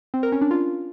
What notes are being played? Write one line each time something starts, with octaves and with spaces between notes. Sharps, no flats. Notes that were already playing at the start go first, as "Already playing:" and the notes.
C4
A#4
C#4
D4
F4